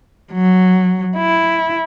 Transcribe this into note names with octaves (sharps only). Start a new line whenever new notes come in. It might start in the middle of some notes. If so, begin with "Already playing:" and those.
F#3
E4